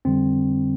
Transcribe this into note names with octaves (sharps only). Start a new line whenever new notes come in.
F2 D3 G3 C4